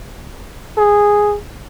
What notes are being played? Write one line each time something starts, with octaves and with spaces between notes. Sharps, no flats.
G#4